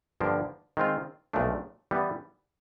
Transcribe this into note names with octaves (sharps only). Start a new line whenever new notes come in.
G2 D3 F3 A#3 D4
D#3 G#3 C4 F4
B1 A#2 F3 A3 D4
E3 G3 B3